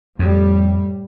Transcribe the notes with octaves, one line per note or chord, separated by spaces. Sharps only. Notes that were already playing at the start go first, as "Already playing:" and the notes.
F2 A2 G3